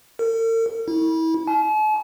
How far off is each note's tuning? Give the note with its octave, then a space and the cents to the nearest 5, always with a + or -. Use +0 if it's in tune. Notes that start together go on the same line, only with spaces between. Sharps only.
A#4 -45
E4 -30
A5 -45